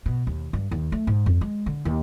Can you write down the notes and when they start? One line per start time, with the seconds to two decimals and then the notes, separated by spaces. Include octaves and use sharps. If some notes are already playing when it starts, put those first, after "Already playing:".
0.06 B2
0.27 D#2
0.53 G2
0.71 D#2
0.92 A3
1.07 G#2
1.26 F2
1.41 G#3
1.66 D3
1.85 D#2